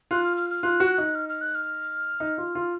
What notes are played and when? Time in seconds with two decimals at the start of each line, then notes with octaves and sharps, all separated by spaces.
0.11 F4 F#6
0.23 F6
0.37 F6
0.50 F6
0.63 F4 F#6
0.80 F#4
0.98 D#4
1.15 F6
1.29 F6
1.41 F#6
1.55 F6
2.20 D#4
2.38 F4
2.55 F4